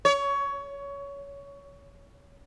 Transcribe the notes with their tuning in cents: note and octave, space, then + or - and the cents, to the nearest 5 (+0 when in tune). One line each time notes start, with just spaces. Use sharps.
C#5 +20